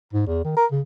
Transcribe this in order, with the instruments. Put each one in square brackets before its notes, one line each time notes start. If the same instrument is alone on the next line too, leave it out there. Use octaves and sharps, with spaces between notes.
[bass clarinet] G#2
E2
D#3
A#4
C#3